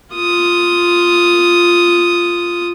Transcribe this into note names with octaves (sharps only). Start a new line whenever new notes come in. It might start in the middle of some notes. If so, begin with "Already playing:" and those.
F4 D#6